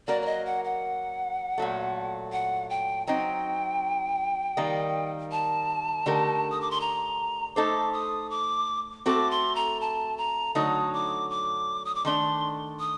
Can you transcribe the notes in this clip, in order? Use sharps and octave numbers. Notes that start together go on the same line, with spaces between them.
F#3 A#3 F#4 A#4 D5
D5
D#5
F#5
F#5
A#2 F#3 A3
F#5
G5
F#3 C4 D#4 G5
D#3 G3 A#3 D#4
A5
D3 A3 D#4 G4 A#4
D#6
D6
C6
A#5
A3 D#4 A4 C5 D6
D#6
D6
A3 C4 F#4 A4 D6
C6
A#5
A5
A#5
D3 F#3 A3 D#4 D#6
D6
D6
D#6
D6
D#3 A3 D4 C6
D#6